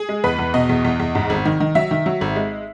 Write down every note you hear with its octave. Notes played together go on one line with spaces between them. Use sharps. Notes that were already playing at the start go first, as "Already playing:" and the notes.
Already playing: G#4
G#3
E2 B4
E2
B2 D#5
E2
E2
E2
G#2
G#1
D#3
D#3
F#3 E5
D#3
F#3
G#1
G#3